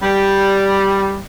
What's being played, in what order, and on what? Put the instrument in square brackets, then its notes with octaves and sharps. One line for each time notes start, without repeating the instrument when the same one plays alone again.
[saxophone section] G3